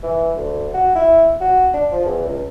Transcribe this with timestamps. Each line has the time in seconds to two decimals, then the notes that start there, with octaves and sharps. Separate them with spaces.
0.03 E3
0.37 D2
0.74 F#4
0.95 E4
1.40 F#4
1.74 D4
1.92 F3
2.05 E2
2.25 C#2